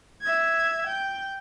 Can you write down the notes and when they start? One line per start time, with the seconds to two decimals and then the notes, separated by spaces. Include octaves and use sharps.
0.21 E5 G#6
0.87 G5